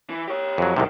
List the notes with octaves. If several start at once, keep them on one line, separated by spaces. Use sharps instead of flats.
E3
G4 C#5
F2 F#3
C2 G#2 C3 D#3